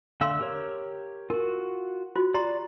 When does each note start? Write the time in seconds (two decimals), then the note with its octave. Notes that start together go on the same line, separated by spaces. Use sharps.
0.21 D3 A3 F5 C6 E6
0.41 G4 A#4 C#5
1.30 F4 F#4 A#4
2.16 F4 F#4 C5
2.34 G4 D5 A#5 C6